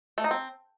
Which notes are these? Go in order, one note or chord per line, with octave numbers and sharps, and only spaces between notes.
A3
D#4
C4